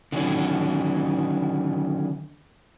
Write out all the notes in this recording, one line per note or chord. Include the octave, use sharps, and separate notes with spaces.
D3 D#3 F#3 C#4